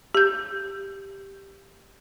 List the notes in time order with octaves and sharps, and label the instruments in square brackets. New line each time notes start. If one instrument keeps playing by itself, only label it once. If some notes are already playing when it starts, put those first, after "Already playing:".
[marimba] G4 G6